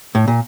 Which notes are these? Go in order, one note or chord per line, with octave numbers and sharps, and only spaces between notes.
A2
A#2